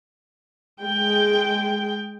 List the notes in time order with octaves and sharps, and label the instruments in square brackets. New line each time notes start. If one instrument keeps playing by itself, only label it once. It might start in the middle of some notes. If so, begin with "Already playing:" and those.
[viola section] G#3 G5